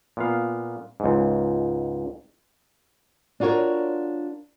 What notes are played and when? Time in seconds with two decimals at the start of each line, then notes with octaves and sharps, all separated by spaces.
0.17 A#2 B3 F5
1.00 C#2 G#2
3.40 D4 F4 F#4 A#4 C#5